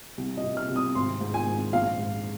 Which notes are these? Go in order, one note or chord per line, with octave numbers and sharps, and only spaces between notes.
C2
D#5
C3
F6
C2
D#6
G#1 C6
G#2
G#5
G#1
A#1 F5
G#2